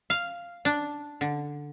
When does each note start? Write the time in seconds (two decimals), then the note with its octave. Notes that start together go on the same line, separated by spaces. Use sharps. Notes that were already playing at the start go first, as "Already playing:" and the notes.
0.10 F5
0.65 D4
1.21 D3